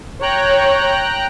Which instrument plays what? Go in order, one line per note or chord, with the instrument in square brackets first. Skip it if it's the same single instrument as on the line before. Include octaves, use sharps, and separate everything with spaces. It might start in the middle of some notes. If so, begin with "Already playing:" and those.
[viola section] C#5 [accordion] G5 A#5 F#6